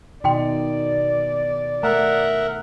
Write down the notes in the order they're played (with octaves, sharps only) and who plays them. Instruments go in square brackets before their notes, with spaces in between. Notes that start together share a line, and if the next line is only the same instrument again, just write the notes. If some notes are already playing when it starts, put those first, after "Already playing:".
[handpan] B2 D#3 D#4 [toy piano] F#4 G5 C6 [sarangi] D5
[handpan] A3 [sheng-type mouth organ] A#4 E5 F#5 [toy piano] A#5